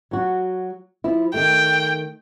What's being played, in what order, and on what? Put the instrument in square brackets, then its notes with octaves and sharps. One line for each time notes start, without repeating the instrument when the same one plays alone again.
[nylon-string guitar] F#3 F#4
F3 E4
[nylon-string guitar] D#3 A3 [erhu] G5